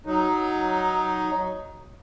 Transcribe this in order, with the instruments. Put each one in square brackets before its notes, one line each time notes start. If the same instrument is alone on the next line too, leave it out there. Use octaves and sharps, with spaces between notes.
[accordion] F#3 D#4